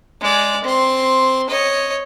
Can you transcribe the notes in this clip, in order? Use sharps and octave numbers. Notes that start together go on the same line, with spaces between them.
G#3 D5
C4 C6
C#5 D#5